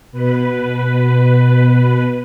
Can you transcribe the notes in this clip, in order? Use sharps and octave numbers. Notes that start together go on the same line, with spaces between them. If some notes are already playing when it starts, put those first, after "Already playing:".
B2 B4